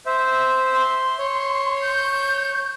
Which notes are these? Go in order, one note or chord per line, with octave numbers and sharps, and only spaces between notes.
C5 E5
C6
C#5
G6